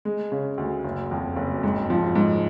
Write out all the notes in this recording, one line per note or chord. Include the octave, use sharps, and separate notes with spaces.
G#3
C#3
D2
F#1
F2
F#1
G#2
F3
G#2